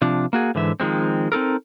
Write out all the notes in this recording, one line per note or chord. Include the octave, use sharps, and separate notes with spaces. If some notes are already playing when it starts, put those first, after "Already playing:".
C3 F3 D4
A#3 F#4 G#4
G#2 D3 E3 E5
D#3 F3 G#3 C4
C4 D#4 A4 A#4